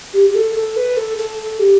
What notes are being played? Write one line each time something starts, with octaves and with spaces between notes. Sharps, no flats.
G4
G4
A4
A4
B4
A4
A4
G4